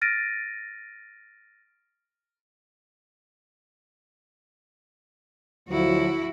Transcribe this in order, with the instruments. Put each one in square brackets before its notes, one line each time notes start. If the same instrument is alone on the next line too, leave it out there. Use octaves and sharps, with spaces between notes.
[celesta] F6 A6 A#6 D7 D#7
[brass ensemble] D2 F3 F#3 [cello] E4 F#4